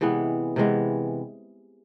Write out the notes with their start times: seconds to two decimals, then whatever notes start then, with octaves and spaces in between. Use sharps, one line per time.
0.01 C3 E3 G#3 B3
0.56 C3 E3 G#3 B3